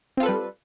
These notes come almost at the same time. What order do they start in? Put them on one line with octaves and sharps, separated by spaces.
C4 F4 A4 B4 G3